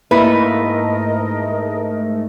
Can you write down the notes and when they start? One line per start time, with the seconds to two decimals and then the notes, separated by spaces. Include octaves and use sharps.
0.11 G#2 A3 A#3 E4 A#4 B4 D#5